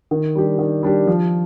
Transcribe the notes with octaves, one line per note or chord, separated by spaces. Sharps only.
D#3
G3 D4 G4
D#3
G3 D4 G4
F3